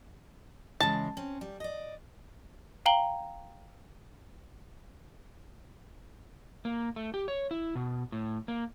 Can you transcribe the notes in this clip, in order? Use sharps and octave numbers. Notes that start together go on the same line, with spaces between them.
C#3 E3 G#3 A5
C4 C#4
G3
D5 D#5
F5 G5 A#5 F#7 G7
A#3
A3
G4
C#5
E4
B2
A2
A#3